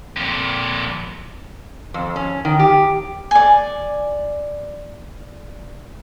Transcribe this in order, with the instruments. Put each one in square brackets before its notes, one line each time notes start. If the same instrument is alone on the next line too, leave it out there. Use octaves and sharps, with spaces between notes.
[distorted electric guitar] F2 A#2
[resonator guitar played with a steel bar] F2
C#4
D#3
G4
[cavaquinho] D5 G#5